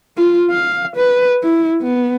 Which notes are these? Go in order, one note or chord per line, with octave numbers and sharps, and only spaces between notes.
F4
F5
B4
E4
B3